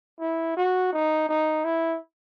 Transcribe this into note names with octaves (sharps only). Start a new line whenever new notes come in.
E4
F#4
D#4
D#4
E4